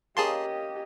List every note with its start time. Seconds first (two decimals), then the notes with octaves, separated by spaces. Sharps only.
0.17 A#3 C#4 G4 G#4 D#5 A5 C6 D#6